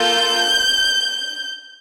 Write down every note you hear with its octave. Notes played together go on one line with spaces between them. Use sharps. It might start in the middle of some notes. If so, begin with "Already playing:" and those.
Already playing: A#3 F4 A4 G6